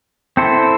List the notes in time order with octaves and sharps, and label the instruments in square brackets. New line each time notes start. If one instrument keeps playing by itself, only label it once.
[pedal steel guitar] C4 E4 A4 C5